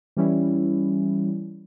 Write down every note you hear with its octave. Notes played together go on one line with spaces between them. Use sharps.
E3 G3 C#4 E4